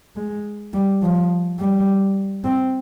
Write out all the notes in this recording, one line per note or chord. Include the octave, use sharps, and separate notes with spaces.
G#3
G3
F3
G3
C4